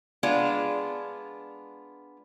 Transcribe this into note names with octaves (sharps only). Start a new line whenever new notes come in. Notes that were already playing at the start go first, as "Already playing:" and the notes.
G#3 B3 D4 F4